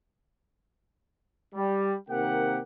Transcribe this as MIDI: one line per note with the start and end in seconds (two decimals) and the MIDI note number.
1.55 1.93 55
2.10 2.60 48
2.10 2.60 51
2.10 2.60 58
2.10 2.60 60
2.10 2.60 67
2.10 2.60 78